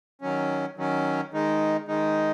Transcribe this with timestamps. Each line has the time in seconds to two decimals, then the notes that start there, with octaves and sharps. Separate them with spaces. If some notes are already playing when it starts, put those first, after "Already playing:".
0.21 D#3 F#3 C#4
0.77 D#3 F#3 C#4
1.32 D#3 G#3 D#4
1.88 D#3 G#3 D#4